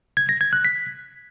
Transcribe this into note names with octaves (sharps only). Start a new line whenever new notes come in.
G#6
A#6
G#6
F#6
B6